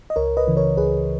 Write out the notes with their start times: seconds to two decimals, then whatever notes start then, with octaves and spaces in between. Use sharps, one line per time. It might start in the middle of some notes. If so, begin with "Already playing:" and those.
0.10 D#5
0.16 C#2 A#4 C#5
0.37 B4 D#5
0.47 C#3 E3
0.57 A#4 C#5
0.77 C#2 G#4 B4